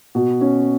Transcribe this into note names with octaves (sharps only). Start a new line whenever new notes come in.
B2
C#4